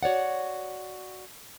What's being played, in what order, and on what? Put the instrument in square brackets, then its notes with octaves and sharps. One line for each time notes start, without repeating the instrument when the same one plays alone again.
[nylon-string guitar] F#4 C#5 D5 F#5